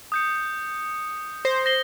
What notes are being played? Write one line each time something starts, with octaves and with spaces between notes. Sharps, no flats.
D#6 G6 C#7
C5 A#6
A#6 C7 G7